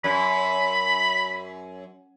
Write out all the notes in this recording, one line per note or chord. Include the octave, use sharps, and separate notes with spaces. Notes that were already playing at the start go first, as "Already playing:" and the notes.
F#2 B5